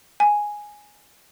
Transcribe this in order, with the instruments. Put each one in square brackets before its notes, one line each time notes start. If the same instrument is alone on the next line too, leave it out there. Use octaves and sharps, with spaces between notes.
[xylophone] G#5